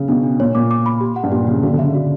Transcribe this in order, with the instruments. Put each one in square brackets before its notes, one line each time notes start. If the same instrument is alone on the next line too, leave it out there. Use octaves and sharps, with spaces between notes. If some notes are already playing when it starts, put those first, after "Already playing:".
Already playing: [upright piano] C#3
[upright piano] B2 [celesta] D4
[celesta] D4
[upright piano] A#2 [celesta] C#5
[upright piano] A#2 [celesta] D6
[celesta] D6
B5
G4
F#5
[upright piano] G2
[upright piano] A#2 [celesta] G4
[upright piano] C#3 [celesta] G4
[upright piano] D3 [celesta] F#4
[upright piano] D3
[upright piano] C#3 [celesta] E5
[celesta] F#4